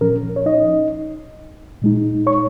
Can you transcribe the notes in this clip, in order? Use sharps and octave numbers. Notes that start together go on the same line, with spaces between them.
A#2 F3 C#4 A#4
C#5
D#4 D#5
A#2 G#3 D#4
C#5 C#6